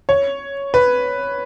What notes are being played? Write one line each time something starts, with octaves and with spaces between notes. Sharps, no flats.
C#5
B4